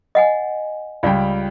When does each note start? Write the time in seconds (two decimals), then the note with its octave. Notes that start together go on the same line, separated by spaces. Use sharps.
0.15 D#5 F#5 G#5
1.03 C#2 G3 F4 D5 G5